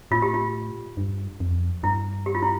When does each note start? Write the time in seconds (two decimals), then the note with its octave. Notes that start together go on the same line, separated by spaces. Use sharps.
0.11 A2 F4
0.22 G4
0.34 F4
0.97 G2
1.40 F2
1.83 G2 E4
2.26 G4
2.35 F4
2.42 E4